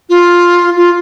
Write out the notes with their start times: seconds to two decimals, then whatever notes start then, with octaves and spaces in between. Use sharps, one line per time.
0.09 F4
0.76 F4